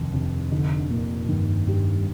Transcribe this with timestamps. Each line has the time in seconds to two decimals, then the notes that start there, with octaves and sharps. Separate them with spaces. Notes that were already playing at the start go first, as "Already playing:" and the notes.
Already playing: F1 D#2
0.13 F1
0.52 D3 D#4
0.90 A#2 A#3
1.29 G2 D#3
1.67 G2 G4